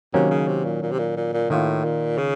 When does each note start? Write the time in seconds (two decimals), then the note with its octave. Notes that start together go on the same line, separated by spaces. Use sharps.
0.14 C3 D#3 F#3 A#3 C#4
0.31 C#3
0.48 C3
0.65 A#2
0.83 A#2
0.91 C3
0.99 A#2
1.17 A#2
1.34 A#2
1.50 A2 D#3 A#3 F4
1.84 A#2
2.18 C#3